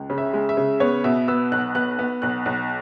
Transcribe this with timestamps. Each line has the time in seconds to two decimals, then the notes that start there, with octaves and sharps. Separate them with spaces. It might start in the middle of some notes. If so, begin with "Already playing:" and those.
Already playing: C#2
0.10 C#3
0.18 E5
0.33 G#3
0.49 E5
0.57 C#3
0.80 B3 C#5
1.04 B2 E5
1.28 B3 E6
1.52 B1 F#6
1.75 B3 F#6
1.99 B3
2.22 B1 F#6
2.46 B1